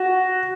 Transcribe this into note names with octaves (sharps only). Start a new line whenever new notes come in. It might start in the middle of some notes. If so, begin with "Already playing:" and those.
Already playing: F#4